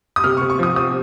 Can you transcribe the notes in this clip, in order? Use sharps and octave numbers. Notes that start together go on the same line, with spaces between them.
D#6
C3 F6
C#6
C3
C#6
F3 D#6
C4 D#6